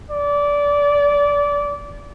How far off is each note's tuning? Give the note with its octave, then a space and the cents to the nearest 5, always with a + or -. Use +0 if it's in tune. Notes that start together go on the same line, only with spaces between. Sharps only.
D5 -20